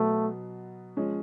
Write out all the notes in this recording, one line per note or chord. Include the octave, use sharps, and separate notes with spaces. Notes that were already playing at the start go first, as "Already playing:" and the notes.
Already playing: B2 F#3 A3 B3
F3 G#3 C#4